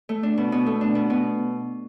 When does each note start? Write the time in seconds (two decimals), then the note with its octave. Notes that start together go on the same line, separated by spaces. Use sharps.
0.09 A3
0.23 D4
0.38 B2
0.52 B2
0.66 A3
0.81 D4
0.95 B2
1.10 B2